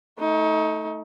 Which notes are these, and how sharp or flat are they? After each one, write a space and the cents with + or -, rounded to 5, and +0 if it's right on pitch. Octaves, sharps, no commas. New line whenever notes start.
A3 +0 D#4 +30